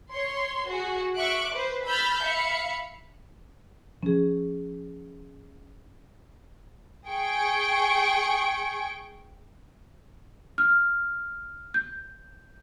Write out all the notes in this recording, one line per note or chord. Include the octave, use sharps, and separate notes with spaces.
C#5 C6
F#4 G#4
E5 C#6 D6 F#6 D7
B4 C5
B5 E6 F6 G6 A6
E5 F5 B5 C#7
F3 C#4 G#4
G#4 G5 C#6 D7
F6
G6